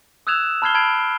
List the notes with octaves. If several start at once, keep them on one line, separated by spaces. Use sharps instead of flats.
D#6 E6 F#6 G#6 E7 F7
A5 B5 F6 G#6 C7 G7
A5 B5 G#6 C7 D7